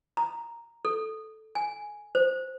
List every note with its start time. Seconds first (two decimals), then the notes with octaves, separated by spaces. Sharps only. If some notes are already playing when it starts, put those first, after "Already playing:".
0.17 A#5
0.85 A4
1.55 G#5
2.15 C5